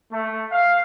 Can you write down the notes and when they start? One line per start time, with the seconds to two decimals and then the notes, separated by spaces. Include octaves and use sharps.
0.12 A3
0.52 F5